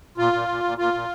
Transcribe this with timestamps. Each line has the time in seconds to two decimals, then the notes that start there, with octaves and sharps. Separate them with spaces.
0.18 A#2 F4
0.33 A#2
0.48 A#2
0.64 A#2
0.78 A#2 F4
0.93 A#2